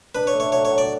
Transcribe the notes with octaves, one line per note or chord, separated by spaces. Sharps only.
D4 B4
C#5
A3
C#5
F#3 C#5
C#5
F#3
D5